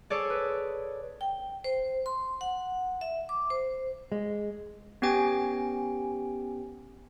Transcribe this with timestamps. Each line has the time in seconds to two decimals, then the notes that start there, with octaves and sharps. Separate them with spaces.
0.10 G#4 A4 C#5 D5
0.30 B4
1.21 G5
1.64 C5
2.06 C6
2.41 F#5
3.01 E5
3.29 D6
3.50 C5
4.12 G#3
5.02 B3 C#4 G4 G5 G#5